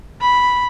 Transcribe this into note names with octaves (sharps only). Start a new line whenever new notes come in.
B5